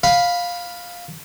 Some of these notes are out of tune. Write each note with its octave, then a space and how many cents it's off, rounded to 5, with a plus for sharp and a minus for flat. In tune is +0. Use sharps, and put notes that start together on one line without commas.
F5 +10 B5 +0